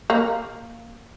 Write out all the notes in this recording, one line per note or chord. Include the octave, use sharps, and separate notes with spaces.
A#3